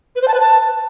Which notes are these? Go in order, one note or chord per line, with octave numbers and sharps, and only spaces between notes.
B4
C5
A5
B4
A5